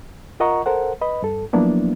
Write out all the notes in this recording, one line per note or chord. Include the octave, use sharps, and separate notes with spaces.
F4 A#4 D#5 F#5 A#5 C#6
A4 A#4 C5 F#5
B4 D#5 B5
G2 A4
F3 F#3 A#3 B3 D4 E4